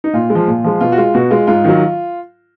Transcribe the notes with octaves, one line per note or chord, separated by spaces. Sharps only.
D#4
A#2 F4
G#3
F3
A#2
F3 G#3
B2 F4
F#4
G#3 F4
B2 F#4
G#3 F4
G#2 F4
D#3 F#3